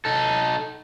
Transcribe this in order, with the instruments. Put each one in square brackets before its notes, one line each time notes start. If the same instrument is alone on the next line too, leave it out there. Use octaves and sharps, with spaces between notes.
[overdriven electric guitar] D#4 A4